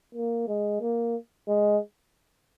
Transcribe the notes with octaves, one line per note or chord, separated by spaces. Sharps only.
A#3
G#3
A#3
G#3